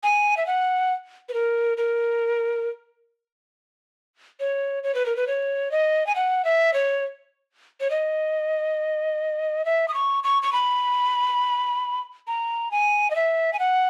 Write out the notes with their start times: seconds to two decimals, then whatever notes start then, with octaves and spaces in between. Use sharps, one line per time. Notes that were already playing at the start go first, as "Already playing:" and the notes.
0.03 G#5
0.37 E5
0.47 F#5
1.29 B4
1.34 A#4
1.77 A#4
4.40 C#5
4.84 C#5
4.95 B4
5.06 A#4
5.16 B4
5.27 C#5
5.71 D#5
6.07 G#5
6.16 F#5
6.45 E5
6.74 C#5
7.80 C#5
7.90 D#5
9.65 E5
9.88 D#6
9.94 C#6
10.24 C#6
10.43 C#6
10.53 B5
12.27 A#5
12.71 G#5
13.11 D#5
13.16 E5
13.53 G#5
13.59 F#5